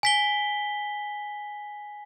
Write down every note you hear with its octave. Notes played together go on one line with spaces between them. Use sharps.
G#5 B6 G7